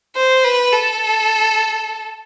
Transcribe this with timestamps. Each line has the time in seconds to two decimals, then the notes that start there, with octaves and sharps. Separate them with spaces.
0.16 C5
0.44 B4
0.73 A4